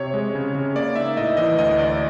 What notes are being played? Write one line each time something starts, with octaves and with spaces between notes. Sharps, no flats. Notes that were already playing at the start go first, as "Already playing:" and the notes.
Already playing: C3 C#5
G#3
C#3
C#3
A#3 D5
D#4 E5
A2 D#5
E3 D#5
D2 D#5
D2 D5